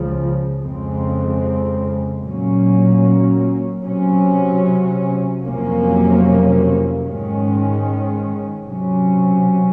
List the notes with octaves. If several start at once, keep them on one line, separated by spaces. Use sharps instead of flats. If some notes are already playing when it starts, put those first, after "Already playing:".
Already playing: C#2 C#3 F3
F2 C#3 G#3 C4
A#2 F#3 A#3 C#4
C3 F#3 C#4
F2 C3 F#3 A#3 C#4
G#2 D#3 G#3 C#4
C3 F#3 C#4